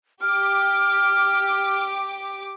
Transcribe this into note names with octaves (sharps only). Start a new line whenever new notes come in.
G4 D6 F6